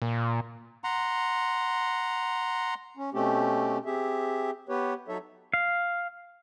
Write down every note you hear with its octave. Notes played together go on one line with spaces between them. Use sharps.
A#2
F#5 A#5 C6
C#4
B2 A3 C4 C#4 G4
C4 G4 G#4 E5
B3 G4 B4 C#5
F#3 D#4 A4 C#5 E5
F5